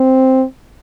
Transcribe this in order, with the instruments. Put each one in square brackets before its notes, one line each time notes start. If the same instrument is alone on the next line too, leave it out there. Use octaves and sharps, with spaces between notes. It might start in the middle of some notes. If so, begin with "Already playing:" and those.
Already playing: [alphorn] C4